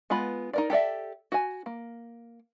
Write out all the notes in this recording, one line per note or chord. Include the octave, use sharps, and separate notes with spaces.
G#3 B3 F4 B5
D#4 A#4 D5
G4 A4 D5 E5
F#4 G#5
A#3